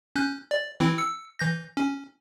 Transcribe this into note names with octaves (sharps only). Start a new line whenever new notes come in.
C#4 F#6 G6
D5
E3 C4 E4
E6 C#7
E3 G6 A#6
C#4